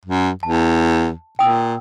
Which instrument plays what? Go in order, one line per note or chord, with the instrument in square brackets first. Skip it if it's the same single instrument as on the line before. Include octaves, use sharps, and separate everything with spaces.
[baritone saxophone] F#2
[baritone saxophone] E2 [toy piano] A5
[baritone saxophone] A#2 [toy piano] G5 D#6 E6